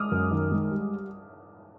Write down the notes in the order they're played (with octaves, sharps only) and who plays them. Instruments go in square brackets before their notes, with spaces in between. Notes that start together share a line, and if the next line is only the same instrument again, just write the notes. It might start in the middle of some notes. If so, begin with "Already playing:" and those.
Already playing: [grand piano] G#3 [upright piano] D6 D#6 F6
[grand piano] F#2
D#3
G#3
G3